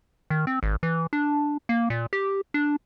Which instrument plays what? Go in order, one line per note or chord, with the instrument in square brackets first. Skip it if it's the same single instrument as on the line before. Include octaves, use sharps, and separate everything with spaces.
[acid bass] D#3
C4
G#1
E3
D4
A#3
A#2
G4
D4